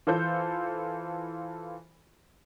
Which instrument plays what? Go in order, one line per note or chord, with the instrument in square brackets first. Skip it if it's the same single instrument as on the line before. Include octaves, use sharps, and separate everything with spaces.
[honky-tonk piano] E3 F4 A4 C5 G6